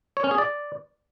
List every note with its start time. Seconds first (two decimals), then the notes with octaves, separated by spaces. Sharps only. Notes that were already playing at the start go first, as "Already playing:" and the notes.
0.17 C#5
0.24 C#4
0.31 G#4
0.38 D5